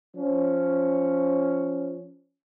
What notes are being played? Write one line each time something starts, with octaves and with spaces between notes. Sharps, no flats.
F3 C#4